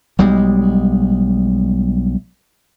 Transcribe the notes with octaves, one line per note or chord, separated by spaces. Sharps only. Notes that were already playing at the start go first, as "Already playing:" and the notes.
B1 G3 G#3